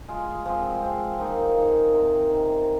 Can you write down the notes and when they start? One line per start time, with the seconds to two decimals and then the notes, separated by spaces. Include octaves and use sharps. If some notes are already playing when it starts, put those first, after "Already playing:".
0.08 G#3 F4 G#4
0.45 F3 G#3 C4
0.82 F3 G#3 C4
1.19 F3 A#3 D#4 G#4
1.56 F3 A#3 D#4 G#4
1.93 C3 D#3 C4
2.29 C3 D#3 C4